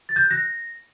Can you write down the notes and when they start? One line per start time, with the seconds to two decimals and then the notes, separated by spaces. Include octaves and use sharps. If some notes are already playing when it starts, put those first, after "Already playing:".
0.09 A6
0.16 G6
0.23 F#6
0.31 A#6